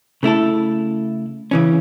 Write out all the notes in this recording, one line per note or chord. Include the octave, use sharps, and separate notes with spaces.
C#3 A3 E4 A4
C#3 E3 C#4